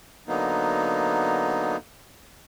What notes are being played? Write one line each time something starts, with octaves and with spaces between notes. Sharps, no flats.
D3 F#3 A#3 B3 D#4